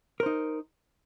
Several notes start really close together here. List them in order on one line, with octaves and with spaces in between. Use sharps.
A#4 C5 D#4